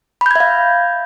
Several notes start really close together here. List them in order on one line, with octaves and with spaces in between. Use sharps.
B5 G6 G#6 E5 F5